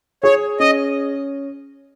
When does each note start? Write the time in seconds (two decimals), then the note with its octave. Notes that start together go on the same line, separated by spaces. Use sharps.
0.23 G#4 C#5
0.60 C#4 D#5